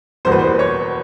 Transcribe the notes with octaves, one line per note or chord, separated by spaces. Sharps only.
E2 B2 G3 A#3 C5
B4
C5
C#5